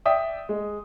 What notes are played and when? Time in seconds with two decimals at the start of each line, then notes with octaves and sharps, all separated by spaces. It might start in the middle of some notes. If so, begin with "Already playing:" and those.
0.06 D5 E5 G5 D#6
0.49 G#3